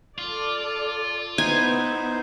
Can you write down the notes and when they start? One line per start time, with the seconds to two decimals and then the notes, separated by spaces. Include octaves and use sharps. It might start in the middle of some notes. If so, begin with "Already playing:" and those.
0.19 F4 A4 D5
1.38 B3 D#4 E4 C5 G#5